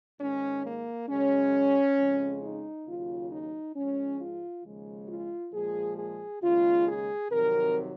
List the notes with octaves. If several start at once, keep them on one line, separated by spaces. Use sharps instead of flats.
G#2 D#3 G#3 C#4
A#3
F#2 C#3 G#3 C#4
F2 C#3 G#3
D#4
D#2 C#3 F#3 F4
D#4
G#2 F3 G#3 C#4
F4
D#2 C#3 F3 G#3
F4
A#2 F3 G#3 G#4
G#4
D#2 C#3 G#3 F4
G#4
F2 C3 D#3 F#3 A#4